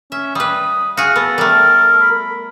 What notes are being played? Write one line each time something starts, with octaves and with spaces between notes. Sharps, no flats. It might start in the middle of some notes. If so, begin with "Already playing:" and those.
C#4 E5
G3 B4 D#6
F#4 G#4 F5
B3 A4
G3 A3 A#4
B5